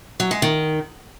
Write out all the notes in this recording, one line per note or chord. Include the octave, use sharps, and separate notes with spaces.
F#3
G#3
D#3